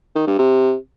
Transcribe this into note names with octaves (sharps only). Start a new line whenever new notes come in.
D#3
G2
C3